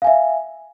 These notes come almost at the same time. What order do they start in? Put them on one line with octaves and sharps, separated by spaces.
F5 G#5 E5